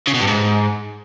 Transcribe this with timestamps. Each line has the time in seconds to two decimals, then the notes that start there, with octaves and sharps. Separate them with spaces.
0.07 C#3
0.14 B2
0.21 G2
0.27 G#2